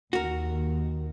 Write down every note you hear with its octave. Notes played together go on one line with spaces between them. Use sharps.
D#2 D#3 F#4 A#4